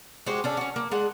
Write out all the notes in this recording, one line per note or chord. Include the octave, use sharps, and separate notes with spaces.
G#3 F#4 G4 C5
C#4 D4 A4
C#4 F#4
A#3
G#3 D4 F#5